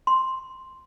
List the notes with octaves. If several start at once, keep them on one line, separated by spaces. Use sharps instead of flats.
C6